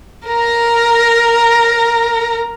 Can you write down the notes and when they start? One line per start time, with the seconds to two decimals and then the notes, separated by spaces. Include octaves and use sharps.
0.28 A#4 A#5